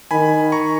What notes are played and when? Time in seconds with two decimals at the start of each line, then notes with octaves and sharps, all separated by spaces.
0.11 D#3 G#5 B5
0.52 A#5 C#6